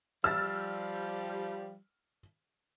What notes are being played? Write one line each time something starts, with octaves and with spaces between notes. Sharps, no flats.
F3 G3 E6 F6 A6